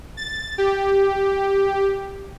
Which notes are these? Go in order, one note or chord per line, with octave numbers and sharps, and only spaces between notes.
A6
G4